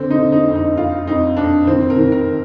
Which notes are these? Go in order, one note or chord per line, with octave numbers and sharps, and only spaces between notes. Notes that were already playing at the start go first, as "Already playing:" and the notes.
Already playing: D3 C4
D#4
D3
D#4
F2
D#4
F2 F4
F2 D#4
F2 D4
D#3 C4
A#4
D#3
A#4